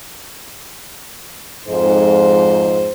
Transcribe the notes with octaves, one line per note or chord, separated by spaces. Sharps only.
F2 G#2 C5